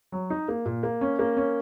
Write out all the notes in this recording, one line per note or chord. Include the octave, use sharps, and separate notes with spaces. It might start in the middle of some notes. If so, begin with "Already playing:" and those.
F#3
D#4
A#3
A#2
A#3
C#4
A#3
C#4